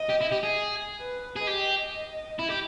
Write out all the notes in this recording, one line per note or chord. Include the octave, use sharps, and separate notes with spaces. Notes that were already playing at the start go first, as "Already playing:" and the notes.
Already playing: D#5
G4
E4
G4
G#4
B4
G#4
G4 D#5
E4
G4